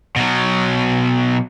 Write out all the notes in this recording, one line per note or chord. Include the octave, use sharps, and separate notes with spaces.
B2 F#3